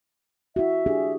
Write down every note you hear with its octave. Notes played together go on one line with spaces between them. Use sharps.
E4 F#4 E5
D4 G4 G#4